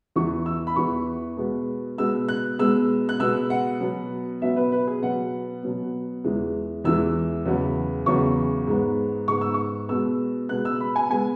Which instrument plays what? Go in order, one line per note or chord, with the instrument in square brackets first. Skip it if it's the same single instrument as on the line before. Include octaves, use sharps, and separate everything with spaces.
[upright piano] E2 E3 B3 C#6
E6
B5
E2 E3 B3 C#6
B2 G#3 B3
B2 G#3 B3 E6
F#6
B2 G#3 B3 E6
F#6
B2 G#3 B3 E6
F#5
B2 F#3 B3
B2 F#3 B3 E5
B4
B4
G#4
B2 F#3 B3 F#5
B2 F#3 B3
E2 E3 G#3
E2 E3 G#3 E6
E2 C#3 F#3 B3
E2 C#3 F#3 B3 C#6
G#2 G#3 B3
G#2 G#3 B3 C#6
E6
C#6
B2 G#3 B3 E6
B2 G#3 B3 F#6
E6
B5
G#5
G#3 B3 G#5